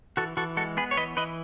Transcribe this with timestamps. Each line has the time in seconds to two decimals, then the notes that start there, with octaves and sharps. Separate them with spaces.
0.17 E3 F#4 A4
0.37 E3 F#4 A4
0.57 G#3 F#4 A4
0.77 B3 G#4 B4
0.91 C#5
0.97 E3 B4 D#5
1.17 E3 B4 D#5